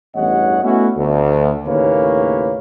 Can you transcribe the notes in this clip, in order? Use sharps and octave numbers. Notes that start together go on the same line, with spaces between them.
A1 E2 G2 C#5 D#5 F#5
A3 B3 C#4 E4 F#4
D2
D#2 A2 C#3 A#3 B4 C#5